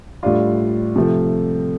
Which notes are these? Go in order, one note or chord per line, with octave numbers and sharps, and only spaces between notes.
A2 G3 D4 F4
C3 F3 A3